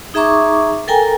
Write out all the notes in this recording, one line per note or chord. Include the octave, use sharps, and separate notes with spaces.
D#4 G#4 E5 A#5 C#6 D6
A4 A#4 G5 G#5 A#5